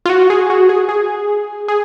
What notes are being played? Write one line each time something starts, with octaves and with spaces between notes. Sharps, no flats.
F4
F#4
G#4
F#4
G#4
G#4
G#4